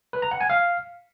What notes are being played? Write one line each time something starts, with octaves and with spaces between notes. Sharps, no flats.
B4
A#5
F#5
G#5
F5